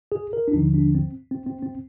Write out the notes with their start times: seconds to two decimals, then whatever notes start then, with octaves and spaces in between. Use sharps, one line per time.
0.12 G#4
0.33 A#4
0.48 D4
0.53 D#2 D3 F3 D#4
0.74 D4
0.95 C4
1.31 C4
1.46 C4
1.63 C4